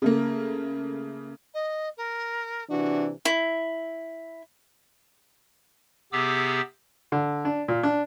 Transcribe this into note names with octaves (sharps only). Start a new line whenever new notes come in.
C#3 A3 A#3
D#5
A#4
C3 E3 D4 F#4
E4
C3 B3 G4 G#4 D6 E6
D3
D4
A#2
D4